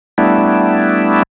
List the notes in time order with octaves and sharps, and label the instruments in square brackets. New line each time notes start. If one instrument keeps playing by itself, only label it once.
[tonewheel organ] G3 A3 B3 D4 E4